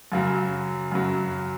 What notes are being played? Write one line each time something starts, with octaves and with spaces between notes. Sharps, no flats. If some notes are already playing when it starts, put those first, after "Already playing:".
F#2 C#3 F#3
F#2 C#3 F#3